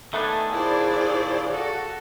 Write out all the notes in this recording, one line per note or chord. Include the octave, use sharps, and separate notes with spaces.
D#3 A3 B3 D4 G#5
A#2 E4 G#4 C5 D5
F#4 A4